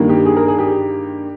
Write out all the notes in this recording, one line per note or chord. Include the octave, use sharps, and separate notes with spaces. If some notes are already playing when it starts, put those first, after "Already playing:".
Already playing: G2 D#3 A#3
G4
G#4
A#4
G#4
G4